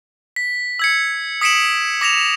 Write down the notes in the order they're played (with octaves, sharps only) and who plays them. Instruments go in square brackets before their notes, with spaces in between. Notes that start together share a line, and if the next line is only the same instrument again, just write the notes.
[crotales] B6
E6 G#6 C#7
D#6 B6 C#7 D7 E7 F#7
D6 A#6 E7 F7